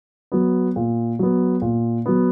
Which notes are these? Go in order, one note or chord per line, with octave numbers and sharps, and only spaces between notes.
F#3 B3
A#2
F#3 B3
A#2
F#3 B3